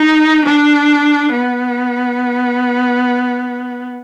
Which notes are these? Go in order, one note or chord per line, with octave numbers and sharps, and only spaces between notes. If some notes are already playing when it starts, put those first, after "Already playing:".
Already playing: D#4
D4
B3